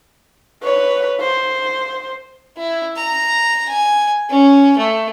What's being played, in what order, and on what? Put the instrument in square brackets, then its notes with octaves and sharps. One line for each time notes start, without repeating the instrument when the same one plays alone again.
[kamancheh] B4 C#5
C5
[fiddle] E4
A#5
G#5
C#4
A3